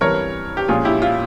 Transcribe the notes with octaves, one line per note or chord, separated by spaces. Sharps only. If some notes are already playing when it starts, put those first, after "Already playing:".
G2 E3 G3 C4 A#4 C#5
G4
A#1 A#2 G#3 C#4 F4 G#4
E4 G4
F4